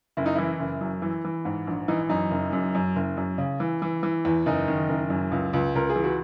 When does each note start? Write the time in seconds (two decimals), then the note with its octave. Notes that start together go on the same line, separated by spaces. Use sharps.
0.17 F#1 E4
0.26 D#4
0.35 E3 E4
0.59 F#1
0.81 F#2
1.02 E3
1.25 E3
1.45 G#2
1.67 A#1
1.88 E3 D#4
2.09 F#2 D#4
2.31 F#1
2.53 F#2
2.75 F#2
2.96 F#1
3.17 F#2
3.38 C#3
3.60 E3
3.82 E3
4.03 E3
4.25 E2
4.46 F#1 D#4
4.68 D#3
4.89 F#1
5.10 F#2
5.32 C#2
5.53 C#2
5.75 C#2 A#4
5.90 G#4
5.96 E3
6.04 F#4